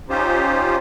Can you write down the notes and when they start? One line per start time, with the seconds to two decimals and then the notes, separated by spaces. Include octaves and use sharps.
0.09 C#4 D#4 F4 G4 C5